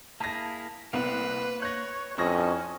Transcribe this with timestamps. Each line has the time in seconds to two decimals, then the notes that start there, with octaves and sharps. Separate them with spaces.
0.20 A#3 E4 G#4 A5 A#6
0.93 C2 A#3 B3 B4 C5 F#5
1.62 C#5 F#6 A#6
2.18 F2 C#4 D4 E4 C#6 D#6 A#6